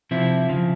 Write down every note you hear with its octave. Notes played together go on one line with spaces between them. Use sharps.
C3 F3 C4 E4
C#3 F3